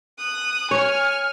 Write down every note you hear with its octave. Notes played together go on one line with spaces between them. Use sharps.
D#6 F#6
C#5 G#5 F6